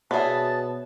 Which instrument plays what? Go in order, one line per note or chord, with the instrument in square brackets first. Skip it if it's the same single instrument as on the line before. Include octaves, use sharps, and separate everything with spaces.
[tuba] B2 [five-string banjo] B3 G#4 [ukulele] C#5 D5 E5 [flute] A5